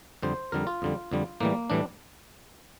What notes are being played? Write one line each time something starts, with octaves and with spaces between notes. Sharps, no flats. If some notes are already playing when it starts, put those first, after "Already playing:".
F2 D3 G3 C5
F2 D3 G3 A#4
F4
F2 D3 G3
F2 D3 G3
A2 E3 G3 A#3
A2 E3 G3 D4